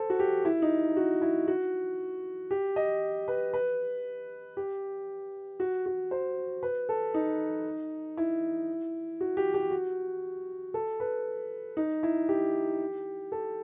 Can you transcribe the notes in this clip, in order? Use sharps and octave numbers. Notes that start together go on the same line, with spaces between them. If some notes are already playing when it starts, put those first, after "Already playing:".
Already playing: A4 C5
F#4
G4
E4
D#4
F#4
E4
F#4
G4
D#5
B4
B4
G4
F#4
F#4
C5
B4
A4
D#4
E4
F#4
G4
G4
F#4
A4
B4
D#4
E4
G4
A4